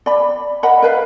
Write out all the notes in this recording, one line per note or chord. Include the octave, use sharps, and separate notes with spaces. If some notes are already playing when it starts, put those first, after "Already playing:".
D5 B5
A#4 D#5 F#5 B5
A#4 B4 F5